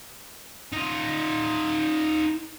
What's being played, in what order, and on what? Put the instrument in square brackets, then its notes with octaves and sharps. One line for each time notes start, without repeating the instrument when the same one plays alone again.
[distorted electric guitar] D#4 F4